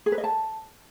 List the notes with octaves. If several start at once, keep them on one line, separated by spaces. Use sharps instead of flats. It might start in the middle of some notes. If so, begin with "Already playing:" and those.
G#4
B4
D#5
A5